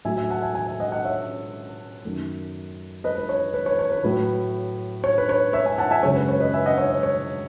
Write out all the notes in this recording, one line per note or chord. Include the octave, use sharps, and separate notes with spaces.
A2 F#3 A3 E5 G#5
E5 G#5
F#5 A5
E5 G#5
E5 G#5
E5 G#5
D#5 F#5
D#5 F#5
C#5 E5
F#2 D#3 A3
B4 D#5
B4
C#5
B4
C#5
C#5
B4
A2 F#3 A3 B4
C#5
B4
C#5
C#5 E5
E5 G#5
F#5 A5
E5 G#5
F#2 C#3 G#3 C#5
B4
C#5
B4 D#5
E5 G#5
D#5 F#5
C#5 E5
C#5
C#5